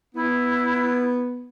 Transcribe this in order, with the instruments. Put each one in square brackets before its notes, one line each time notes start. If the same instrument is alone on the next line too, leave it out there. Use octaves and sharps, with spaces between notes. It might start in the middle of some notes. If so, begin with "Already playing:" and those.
[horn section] B3 [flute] E4